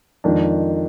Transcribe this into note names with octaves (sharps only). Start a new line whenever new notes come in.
F2 D#3 G#3 D4